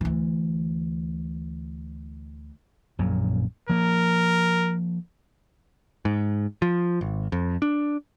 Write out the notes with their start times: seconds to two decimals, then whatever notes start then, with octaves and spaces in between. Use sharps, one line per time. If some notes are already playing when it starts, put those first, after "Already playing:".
0.01 D2 E3
2.99 A#1 F#2 A#2
3.69 F3 A#3 A#4
6.05 G#2
6.62 F3
7.01 G#1
7.32 F2
7.62 D4